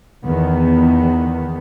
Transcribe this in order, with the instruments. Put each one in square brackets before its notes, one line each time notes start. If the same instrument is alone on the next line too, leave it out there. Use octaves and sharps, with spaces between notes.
[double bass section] E2 D#3 B3